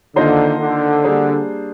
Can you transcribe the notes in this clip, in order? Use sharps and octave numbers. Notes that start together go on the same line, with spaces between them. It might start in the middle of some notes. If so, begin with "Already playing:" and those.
D3 D#3 A#3 F4 C5 D#5
D3
G3 A#3 D4 G#4 C5